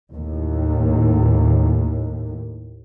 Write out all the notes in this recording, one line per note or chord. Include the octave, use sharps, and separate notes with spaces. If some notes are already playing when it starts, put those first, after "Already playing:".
D#2 A2